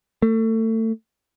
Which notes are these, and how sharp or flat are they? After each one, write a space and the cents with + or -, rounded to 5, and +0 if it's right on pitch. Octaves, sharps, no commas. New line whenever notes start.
A3 +30